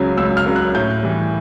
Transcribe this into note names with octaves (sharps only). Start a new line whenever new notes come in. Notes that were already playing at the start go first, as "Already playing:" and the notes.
Already playing: C#2 C#3 F#3
C#2 E6
F6
C#3 F#3
F#6
A2 G6
E3 G3